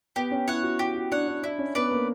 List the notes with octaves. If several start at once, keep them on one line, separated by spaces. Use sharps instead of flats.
B3 G4
C#4
E4 C#5 F#5
F#4
F#4 G4
F#4
D4 C#5 F#5
D4
D4 E4
C#4
B3 B4 D5
A#3